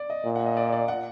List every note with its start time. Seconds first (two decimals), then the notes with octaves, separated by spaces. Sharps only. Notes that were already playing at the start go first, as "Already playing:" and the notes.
Already playing: D5
0.10 D#5
0.25 A#2
0.36 F#5
0.46 D#5
0.57 D5
0.73 D5
0.88 F#5